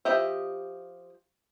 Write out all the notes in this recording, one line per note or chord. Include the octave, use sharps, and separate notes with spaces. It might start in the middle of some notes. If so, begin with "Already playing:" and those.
F3 G4 D#5 E5